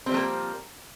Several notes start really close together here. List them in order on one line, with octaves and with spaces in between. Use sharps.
C4 G3 F3 A3 A#3